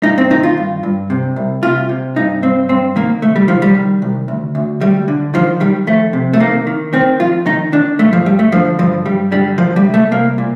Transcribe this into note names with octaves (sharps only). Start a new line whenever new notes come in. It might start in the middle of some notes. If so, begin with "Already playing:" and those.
G2 D#4
C4
D#3 D#4
F4
G2
G2
C3
C2
C3 F4
C3
G2 D#4
G2 C4
G2 C4
D#3 A#3
C2 A3
G3
D#3 F3
G3
D#3
C2
D2
D2
D2 G3
D3
D#3 F3
D#3 G3
F2 A3
C3
A3
D#3 A#3
D#3
D#3 C4
F2 F4
D#3 D#4
D#3 D4
G2 A3
F3
G2 G3
A3
D3 F3
G2 F3
G2 G3
D3 G3
A#2 F3
G3
C2
A3
C2 A#3
A#2